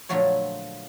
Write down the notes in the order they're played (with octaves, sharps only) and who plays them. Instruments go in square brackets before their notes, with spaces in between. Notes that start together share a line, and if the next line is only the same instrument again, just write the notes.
[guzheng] A#2 D3 F3 F#3 A3 C#5